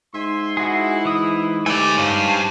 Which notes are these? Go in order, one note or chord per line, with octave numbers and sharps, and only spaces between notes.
G#2 E5 G#5 C6
E4 F#4 G#4
E3 D#6
A3 G4 B4 D5 G#5
G2 C#4 C5 F5